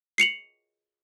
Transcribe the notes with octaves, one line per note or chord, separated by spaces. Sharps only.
C7 C#7 F7 F#7